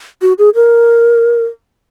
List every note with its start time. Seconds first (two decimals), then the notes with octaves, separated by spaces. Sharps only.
0.22 F#4
0.38 G#4
0.55 A#4